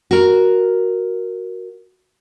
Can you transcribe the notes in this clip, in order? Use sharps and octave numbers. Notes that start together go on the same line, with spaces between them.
F#4 A#4